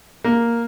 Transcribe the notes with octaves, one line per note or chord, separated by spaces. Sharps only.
A#3